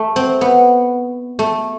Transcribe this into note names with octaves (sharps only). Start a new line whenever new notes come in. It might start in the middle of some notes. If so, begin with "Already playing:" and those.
Already playing: A3
C4
B3
A3